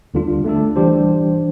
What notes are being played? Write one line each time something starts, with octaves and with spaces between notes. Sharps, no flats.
D2 D3 G3 D4 F4
D3 A3 D4 A4
E3 G3 D4 G4 C5